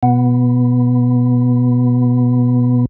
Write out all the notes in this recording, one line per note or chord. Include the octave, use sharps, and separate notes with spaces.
B2 B3